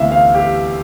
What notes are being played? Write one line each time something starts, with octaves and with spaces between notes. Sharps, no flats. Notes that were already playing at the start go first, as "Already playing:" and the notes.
Already playing: D2 C3 E3 B3 E5 F5
F5
G4